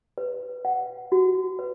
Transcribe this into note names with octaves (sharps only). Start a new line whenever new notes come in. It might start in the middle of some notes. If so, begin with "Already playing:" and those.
B4
F#5
F#4
B4